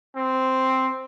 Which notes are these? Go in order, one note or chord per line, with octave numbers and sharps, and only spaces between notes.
C4